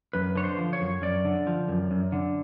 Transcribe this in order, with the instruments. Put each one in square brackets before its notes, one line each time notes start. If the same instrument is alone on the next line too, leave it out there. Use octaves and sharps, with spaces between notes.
[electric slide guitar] F#2 B4
D3 C#5
C5
F3
C#5
F#2
F#2 D5
D3
F3
F#2
F#2
D3